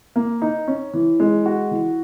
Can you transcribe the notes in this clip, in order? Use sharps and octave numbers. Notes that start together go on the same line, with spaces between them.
A#3
D#4
C#4
E3
G#3
F#4
E3